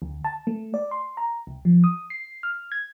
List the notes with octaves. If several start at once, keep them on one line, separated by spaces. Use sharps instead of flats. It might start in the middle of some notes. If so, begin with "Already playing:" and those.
D2
A5
A3
D5
C6
A#5
C2
F3
D#6
C7
F6
G#6